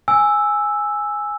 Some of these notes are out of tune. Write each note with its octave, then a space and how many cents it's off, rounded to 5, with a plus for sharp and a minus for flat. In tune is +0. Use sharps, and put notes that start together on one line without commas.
G#5 +0 E6 +0